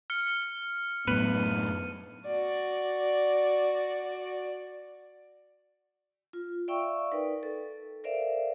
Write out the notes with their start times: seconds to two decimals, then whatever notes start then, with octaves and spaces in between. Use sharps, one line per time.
0.10 F6 C#7
1.07 F#2 A2 B3 B4 D#7
2.26 F#4 D5
6.33 F4
6.68 D5 E5 F5 G5 C#6 E6
7.12 D#4 A#4 B4 D5
7.43 A4
8.04 A#4 C5 D5 E5 F5